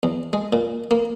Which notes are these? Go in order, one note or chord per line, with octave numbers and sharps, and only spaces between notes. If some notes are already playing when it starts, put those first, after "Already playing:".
E2
G#3
A#2
A#3